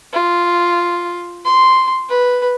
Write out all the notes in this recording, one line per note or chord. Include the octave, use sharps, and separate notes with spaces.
F4
C6
B4